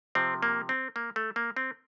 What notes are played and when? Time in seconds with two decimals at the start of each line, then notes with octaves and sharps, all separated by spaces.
0.15 C3 F3 C4
0.43 A#3
0.69 C4
0.96 A#3
1.16 A3
1.36 A#3
1.56 C4